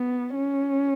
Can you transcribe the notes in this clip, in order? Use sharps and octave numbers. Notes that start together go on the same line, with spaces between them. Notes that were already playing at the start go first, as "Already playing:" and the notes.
Already playing: B3
C#4